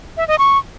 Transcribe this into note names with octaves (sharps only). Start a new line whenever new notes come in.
E5
D#5
C#6